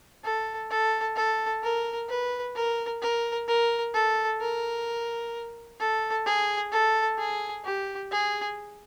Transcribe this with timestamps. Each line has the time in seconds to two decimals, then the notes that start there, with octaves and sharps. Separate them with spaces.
0.24 A4
0.70 A4
1.16 A4
1.63 A#4
2.09 B4
2.55 A#4
3.02 A#4
3.48 A#4
3.94 A4
4.41 A#4
5.80 A4
6.26 G#4
6.72 A4
7.18 G#4
7.64 G4
8.11 G#4